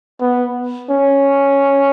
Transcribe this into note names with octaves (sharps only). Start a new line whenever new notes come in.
B3
C#4